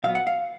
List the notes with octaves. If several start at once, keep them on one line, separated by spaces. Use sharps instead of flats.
A#2 F#3 B3 F5
F#5
F5